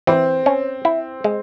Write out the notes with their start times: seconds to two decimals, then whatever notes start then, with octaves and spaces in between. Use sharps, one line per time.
0.07 E3 C4
0.46 C#4
0.85 E4
1.24 G#3